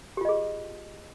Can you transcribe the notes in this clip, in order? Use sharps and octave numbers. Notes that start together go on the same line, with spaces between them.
F4 G4 G#4 D#5